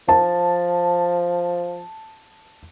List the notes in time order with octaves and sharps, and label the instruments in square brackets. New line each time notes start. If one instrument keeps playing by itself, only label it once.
[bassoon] F3 [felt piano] A5